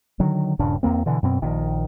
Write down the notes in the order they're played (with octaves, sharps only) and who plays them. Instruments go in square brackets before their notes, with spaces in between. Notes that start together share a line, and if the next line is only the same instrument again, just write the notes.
[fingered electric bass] D3 D#3 F#3
D#1 G2 C#3 D4
E2 A#2 A#3 C4
B2 D3 E3
F#2 B2 C4
A#1 D#3